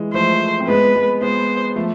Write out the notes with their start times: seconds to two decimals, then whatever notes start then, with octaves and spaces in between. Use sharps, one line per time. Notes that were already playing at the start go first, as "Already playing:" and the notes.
Already playing: E3 G#3
0.14 F3 A3 C5
0.60 C4
0.67 G#3 B3 B4
0.95 G#3 B3
1.21 G#3 B3 C5
1.76 F3 A3